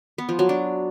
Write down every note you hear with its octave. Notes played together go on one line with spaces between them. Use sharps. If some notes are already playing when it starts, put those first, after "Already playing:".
B3
F3
F#3
D4